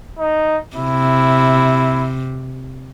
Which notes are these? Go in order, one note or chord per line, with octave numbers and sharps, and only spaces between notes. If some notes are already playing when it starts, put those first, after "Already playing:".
D#4
C3 E4